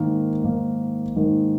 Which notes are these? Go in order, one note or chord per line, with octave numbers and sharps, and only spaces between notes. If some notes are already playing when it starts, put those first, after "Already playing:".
Already playing: G#2 D#3 A#3
G#2 D#3 A#3
G#2 D#3 A#3